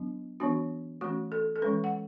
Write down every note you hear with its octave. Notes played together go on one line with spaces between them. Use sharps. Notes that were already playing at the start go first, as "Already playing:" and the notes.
Already playing: F#3 B3 D4
E3 B3 D4 F#4
E3 A3 C#4 F#4
A4
A4
E3 G#3 C#4 B4
F#5